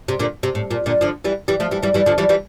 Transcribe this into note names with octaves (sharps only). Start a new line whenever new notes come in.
C3
A#2 D3
C3
A2
A#2
A#2 D3
D3 F3
E3 G3
E3 G3
F3 A3
E3 G3
E3 G3
E3 G3
D3 F3
E3 G3
E3 G3